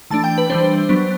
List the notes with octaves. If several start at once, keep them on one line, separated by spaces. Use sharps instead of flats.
E3 A3 D4 A5
G5
B4
E3 G3 D4 C5
F#3 B3 D4